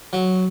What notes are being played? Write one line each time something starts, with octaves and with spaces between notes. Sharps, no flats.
F#3